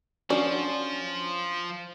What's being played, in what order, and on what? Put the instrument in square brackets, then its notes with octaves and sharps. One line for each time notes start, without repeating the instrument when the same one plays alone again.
[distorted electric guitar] F3 [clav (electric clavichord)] C#4 [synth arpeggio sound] D4 F#4 [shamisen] D5